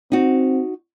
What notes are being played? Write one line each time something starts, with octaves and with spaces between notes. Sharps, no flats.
C4 D#4 F#4